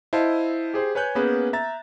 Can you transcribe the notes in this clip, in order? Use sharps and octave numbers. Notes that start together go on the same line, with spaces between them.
E4 C5 D#5 F5 A5
G4 G#4 C5
B4 C#5 G#5 F#6 G6
A#3 B3 C#4 G#4 B4
E5 A#5 A6